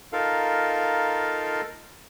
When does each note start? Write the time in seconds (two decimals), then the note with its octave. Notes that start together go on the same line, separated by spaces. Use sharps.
0.13 D#4 F4 A4 A#4 F5